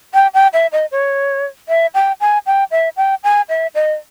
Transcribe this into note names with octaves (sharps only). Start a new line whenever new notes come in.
G5
G5
E5
D#5
C#5
E5
G5
G#5
G5
E5
G5
G#5
E5
D#5